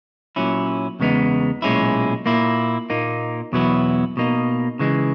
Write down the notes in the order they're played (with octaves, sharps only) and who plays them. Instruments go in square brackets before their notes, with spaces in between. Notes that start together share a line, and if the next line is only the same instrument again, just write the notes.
[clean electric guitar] A#2 F#3 C#4 E4
E2 C#3 G#3 B3 D#4
B1 A#2 G#3 C#4 E4
A#2 A#3 E4
A#2 A#3 D#4
E2 B2 F#3 B3 E4
B2 A#3 D#4
C#3 E3 G#3